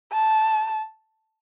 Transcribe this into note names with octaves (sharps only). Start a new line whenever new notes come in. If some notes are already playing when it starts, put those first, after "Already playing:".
A5